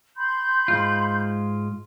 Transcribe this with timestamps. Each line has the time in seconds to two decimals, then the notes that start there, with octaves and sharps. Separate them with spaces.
0.16 B5 C6 G6
0.68 G#2 G#3 F4